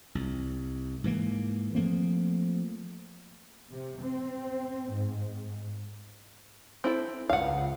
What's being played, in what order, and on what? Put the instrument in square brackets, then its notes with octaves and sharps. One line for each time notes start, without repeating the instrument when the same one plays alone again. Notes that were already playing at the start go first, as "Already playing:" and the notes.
[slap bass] C2
G#2 E3 A#3
F3 A3 A#3 C4
[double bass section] C3
C4
G#2
[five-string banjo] C4 E4 A4
[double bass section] C#2 [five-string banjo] F5 F#5